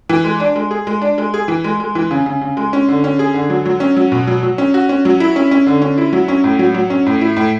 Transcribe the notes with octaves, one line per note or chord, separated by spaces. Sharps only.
E3
G#3
D4
G#3
G#4
G#3
D4
G#3
G#4
E3
G#3
G#3
E3
C#3
C#3
C#3
G#3
C#4
D3
C#4
G#4
D3
F#3
F#3
C#4
F#3
B2
F#3
F#3
C#4
F#4
C#4
F#3
E4
C#4
C#4
D3
C#4
E4
F#3
C#4
A2
F#3
F#3
C#4
A2
E4
A2